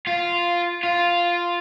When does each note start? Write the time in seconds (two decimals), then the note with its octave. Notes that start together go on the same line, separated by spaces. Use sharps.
0.07 F4
0.83 F4